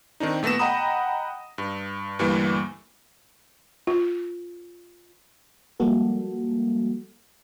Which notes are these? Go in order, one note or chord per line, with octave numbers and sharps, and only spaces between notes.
D#3 C4 D4 D#4
A#2 A3 B3 A#6 E7
D#5 F#5 G5 A#5 B5 D#6
G2
D2 G2 E3 G3 A#3
F4
F3 G3 G#3 A#3 F#4 A4